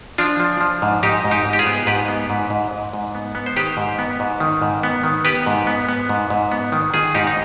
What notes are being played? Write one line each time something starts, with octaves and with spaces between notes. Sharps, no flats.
F3 D4 F4
F3
F3
G#2
G#2 D#4 G4
G#2
D#4 G4
G#2
G4
F4 G#4
B3
G#2 G4 B4
B3
G#2
G#2
G#2
G#2
B3
B3
C5
D#3 G4 B4
G#2
B3
G#2
D#3
G#2
B3
D#3
B3 G4 B4
G#2
B3
B3
G#2
G#2
B3
D#3
D#3 F4 G#4
G#2 D#4 G4
D#4